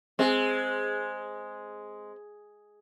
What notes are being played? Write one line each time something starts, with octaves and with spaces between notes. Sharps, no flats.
G#3 C4 G#4